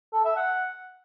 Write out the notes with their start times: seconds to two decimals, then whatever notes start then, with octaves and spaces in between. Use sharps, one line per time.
0.13 A4
0.25 E5
0.37 F#5